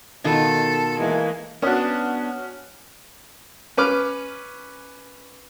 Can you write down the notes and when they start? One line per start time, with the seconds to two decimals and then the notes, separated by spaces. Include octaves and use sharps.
0.24 B2 D#3 F4 A4
0.99 E3 G#3 A#3
1.62 B3 C#4 D4 F#4
3.77 C#4 B4 D6 F6